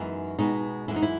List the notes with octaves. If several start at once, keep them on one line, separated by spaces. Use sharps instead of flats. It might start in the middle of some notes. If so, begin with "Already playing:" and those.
Already playing: F#2 E3 G#3 B3 D#4
B2 G#3 B3 D#4
F#2 E3 G#3 E4
D#4
E4